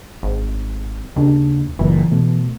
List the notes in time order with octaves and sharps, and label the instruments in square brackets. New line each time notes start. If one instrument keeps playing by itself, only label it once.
[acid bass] G#1
[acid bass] D#2 [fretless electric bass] C#3 D4
[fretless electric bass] F#1 A#2 [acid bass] E3
[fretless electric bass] B2 A3